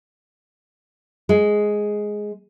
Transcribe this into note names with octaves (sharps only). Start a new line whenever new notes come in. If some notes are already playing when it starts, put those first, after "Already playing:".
G#3